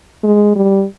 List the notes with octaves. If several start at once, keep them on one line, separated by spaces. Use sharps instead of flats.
G#3
G3